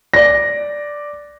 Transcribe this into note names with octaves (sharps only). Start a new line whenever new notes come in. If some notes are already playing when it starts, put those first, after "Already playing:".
D5 A#6